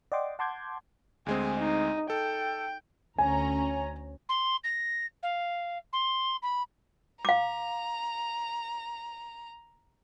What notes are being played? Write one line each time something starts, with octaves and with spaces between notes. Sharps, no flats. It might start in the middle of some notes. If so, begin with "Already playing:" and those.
D5 D#5 F#5 G5 C6 D6
F#5 A5 C6 D6 G6 G#6
D2 G#3 C4 G#4
D#4
A4 G5
D2 C#4 G#5 A#5
C6
A#6
F5
C6
B5
F5 A#5 D6